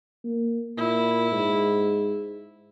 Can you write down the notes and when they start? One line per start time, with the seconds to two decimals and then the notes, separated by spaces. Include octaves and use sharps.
0.24 A#3
0.77 A#2 E4
1.32 G#2